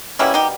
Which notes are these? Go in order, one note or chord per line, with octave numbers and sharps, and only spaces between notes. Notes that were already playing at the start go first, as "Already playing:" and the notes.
B2 G3 A#3 C#4 E4
D#4 G4